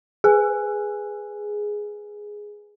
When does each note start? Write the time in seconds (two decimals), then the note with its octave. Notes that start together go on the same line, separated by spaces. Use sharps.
0.24 G#4 B4 G#5 F#6